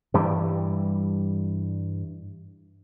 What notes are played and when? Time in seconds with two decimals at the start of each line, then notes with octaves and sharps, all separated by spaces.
0.14 G2 E3 G3